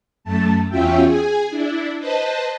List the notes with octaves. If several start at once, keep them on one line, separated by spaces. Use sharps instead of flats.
F#2 A3 A5
E2 C#4 F4 F#4 E5 G5
G#4 G#5
D4 E4
B4 C5 D#5 A5